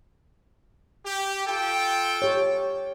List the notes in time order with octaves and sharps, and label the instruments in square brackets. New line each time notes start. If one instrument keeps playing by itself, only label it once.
[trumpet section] G4
F4 A4 G5
[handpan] G4 C#5